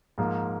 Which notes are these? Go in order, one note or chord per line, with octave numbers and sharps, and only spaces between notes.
G#2 F3 A#3